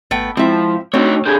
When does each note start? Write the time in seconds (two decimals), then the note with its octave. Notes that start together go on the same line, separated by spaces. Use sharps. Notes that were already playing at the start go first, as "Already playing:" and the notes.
0.11 G#1 A3 B3 G5
0.37 F3 G#3 C4 E4 E5
0.94 A3 C4 D4 D#4 F#4 C#5
1.26 D3 G#4 G6 G#6